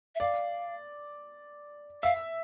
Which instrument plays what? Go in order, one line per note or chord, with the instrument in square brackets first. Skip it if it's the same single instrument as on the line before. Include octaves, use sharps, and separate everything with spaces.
[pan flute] E5
[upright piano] D5 [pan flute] F5
[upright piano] E5 [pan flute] F5